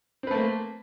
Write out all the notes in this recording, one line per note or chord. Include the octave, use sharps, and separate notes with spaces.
A3 A#3 C4 B4